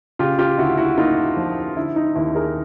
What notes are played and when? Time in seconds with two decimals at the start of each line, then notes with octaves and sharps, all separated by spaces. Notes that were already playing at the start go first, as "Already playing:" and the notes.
0.19 C#3 F4 G4
0.39 F4 G4
0.58 D2 E4 F#4
0.78 E4 F#4
0.98 A#3 D#4 F4
1.37 F3
1.76 D3 E4
1.96 D#4
2.15 D#2 E4
2.35 G#4 A#4